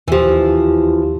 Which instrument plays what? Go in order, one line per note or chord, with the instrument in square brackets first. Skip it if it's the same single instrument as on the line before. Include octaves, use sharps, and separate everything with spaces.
[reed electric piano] D#2 G4 [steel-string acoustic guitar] E3 F3